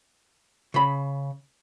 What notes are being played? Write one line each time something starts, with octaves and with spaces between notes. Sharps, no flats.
C#3 B5